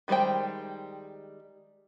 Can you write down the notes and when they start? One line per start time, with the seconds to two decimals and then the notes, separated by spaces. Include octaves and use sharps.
0.08 D#3 G3 G#3 C5 G5